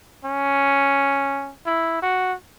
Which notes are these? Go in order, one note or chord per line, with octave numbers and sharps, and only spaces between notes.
C#4
E4
F#4